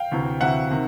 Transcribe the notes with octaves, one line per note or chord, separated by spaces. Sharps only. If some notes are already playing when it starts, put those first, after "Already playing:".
Already playing: F5 G5
D2 C3 E3
D2 C3 E3 E5 F#5
C3 D#3